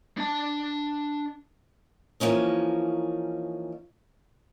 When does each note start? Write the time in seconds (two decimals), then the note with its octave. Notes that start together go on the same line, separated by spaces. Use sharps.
0.18 D4 A5
2.20 E3 F3 A#3 C#4 D#4